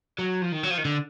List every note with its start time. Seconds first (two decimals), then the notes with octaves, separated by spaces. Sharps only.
0.19 F#3
0.42 F3
0.52 D#3
0.63 F#3
0.71 F3
0.78 D#3
0.85 D3